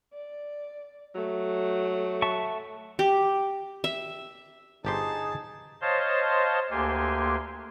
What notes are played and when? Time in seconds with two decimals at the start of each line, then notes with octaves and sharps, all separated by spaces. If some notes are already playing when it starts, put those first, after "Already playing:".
0.13 D5
1.15 F#3 A3
2.22 E5 A5 C#6
2.99 G4
3.84 E5
4.85 G1 D#4 G4 G#4 C5 A5
5.81 C5 C#5 D#5 F5 A5 C6
6.71 D2 A#3 G4 G#5 C6